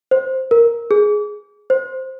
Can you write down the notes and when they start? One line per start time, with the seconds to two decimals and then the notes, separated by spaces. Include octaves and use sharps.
0.11 C5
0.51 A#4
0.91 G#4
1.70 C5